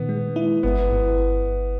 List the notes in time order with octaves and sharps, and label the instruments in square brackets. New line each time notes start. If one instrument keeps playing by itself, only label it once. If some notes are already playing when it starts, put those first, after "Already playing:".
Already playing: [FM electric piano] A#2 D#3 [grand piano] B3
[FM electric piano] G#3
E4
[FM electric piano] G1 [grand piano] B3
[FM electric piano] G1